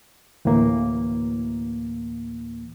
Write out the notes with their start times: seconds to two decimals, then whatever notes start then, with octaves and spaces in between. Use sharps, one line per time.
0.45 D2 A2 E3 A#3